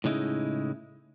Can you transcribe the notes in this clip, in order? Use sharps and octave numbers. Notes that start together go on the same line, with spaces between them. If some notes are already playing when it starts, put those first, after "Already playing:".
A2 C#3 G#3 D#4 E4